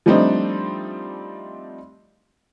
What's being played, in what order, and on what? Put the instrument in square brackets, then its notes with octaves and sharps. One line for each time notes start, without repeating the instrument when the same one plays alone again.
[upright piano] F3 G3 A3 C4 D4 D#4